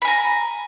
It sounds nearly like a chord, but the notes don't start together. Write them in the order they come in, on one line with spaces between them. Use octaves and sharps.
B5 G#5 A#5